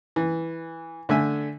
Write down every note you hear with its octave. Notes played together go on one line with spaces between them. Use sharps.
E3
D3 A3 E5 G#5